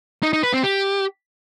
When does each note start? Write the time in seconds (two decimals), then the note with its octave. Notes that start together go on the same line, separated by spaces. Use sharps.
0.23 D#4
0.33 D#4
0.43 B4
0.53 C4
0.64 G4